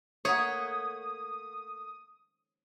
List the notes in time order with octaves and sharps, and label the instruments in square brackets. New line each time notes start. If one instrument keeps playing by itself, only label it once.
[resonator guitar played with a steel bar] A3 A#3 F#5 [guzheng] C#5 [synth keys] D#6